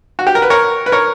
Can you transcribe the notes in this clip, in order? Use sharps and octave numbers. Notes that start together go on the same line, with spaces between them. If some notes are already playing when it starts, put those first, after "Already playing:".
F#4
G4
A#4
B4
A#4 C#5
B4
A#4 C#5